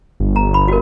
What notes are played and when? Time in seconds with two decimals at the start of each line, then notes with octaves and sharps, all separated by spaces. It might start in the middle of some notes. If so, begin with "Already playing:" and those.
0.20 G1
0.36 A#5
0.54 B5
0.68 F#4 A#4